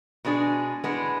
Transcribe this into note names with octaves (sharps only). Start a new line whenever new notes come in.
B2 G#3 B3 D4 G#4
A2 G#3 B3 D4